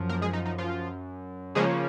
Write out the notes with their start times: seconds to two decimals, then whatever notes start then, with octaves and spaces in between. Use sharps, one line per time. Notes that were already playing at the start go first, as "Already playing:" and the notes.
Already playing: F#2 F3
0.09 A#3 A#4
0.21 G#3 G#4
0.33 D#4
0.46 D#4
0.58 F3 F4
1.55 C#3 F3 G#3 A#3 C#4 G#4